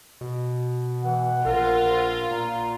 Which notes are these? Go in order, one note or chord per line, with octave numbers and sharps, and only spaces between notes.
B2
E3 F#5
A#1 F4 A#4
A#2 A#5